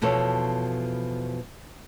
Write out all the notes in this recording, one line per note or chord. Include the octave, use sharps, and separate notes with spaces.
E2 B2 F3 A4 C#5